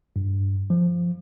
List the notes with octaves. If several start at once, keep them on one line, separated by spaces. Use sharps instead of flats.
G2
F3